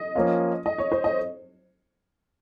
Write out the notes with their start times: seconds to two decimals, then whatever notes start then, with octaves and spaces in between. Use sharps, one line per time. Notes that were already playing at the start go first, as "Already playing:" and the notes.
Already playing: D#5
0.15 F3 A#3 C#4 F4
0.66 D#5
0.78 C#5
0.92 C5
1.04 D#5